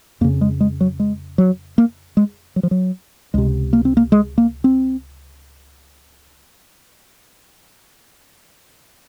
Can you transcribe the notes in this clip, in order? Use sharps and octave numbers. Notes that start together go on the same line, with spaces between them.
F2 C#3 A#3
G#3
G#3
F#3
G#3
F#3
A#3
G#3
F#3
F3
F#3
C#2 C3 G#3
A#3
C4
A#3
G#3
A#3
C4